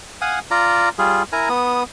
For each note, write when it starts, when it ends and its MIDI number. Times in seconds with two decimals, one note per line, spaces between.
0.21 0.39 77
0.21 0.39 78
0.21 0.39 80
0.21 0.39 87
0.51 0.89 65
0.51 0.89 74
0.51 0.89 82
0.98 1.23 55
0.98 1.23 65
0.98 1.23 68
1.32 1.49 64
1.32 1.49 70
1.32 1.49 80
1.32 1.49 82
1.49 1.83 59
1.49 1.83 87